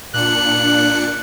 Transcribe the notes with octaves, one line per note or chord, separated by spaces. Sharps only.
A#2 D4 F#6 C#7